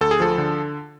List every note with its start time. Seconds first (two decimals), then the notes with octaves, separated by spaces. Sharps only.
0.01 D2 A4
0.11 G#4
0.20 F3 A4
0.38 D3